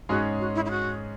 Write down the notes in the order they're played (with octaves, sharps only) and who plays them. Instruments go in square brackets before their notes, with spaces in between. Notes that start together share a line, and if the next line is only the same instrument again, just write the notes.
[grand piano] G#2 G#3 C#4 G#4 C#5 [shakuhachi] F#4
[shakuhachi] F#4
E4
E4
F#4